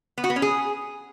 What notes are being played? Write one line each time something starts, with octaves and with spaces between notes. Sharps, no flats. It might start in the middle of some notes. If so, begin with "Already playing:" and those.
B3
F#4
B3
C#4
G#4